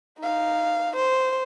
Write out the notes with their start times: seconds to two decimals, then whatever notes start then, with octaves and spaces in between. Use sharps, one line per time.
0.19 D#4 F5
0.96 C5